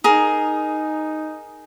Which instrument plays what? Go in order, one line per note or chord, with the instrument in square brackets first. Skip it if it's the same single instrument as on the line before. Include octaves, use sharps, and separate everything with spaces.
[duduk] D#4 [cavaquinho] G#4 A#4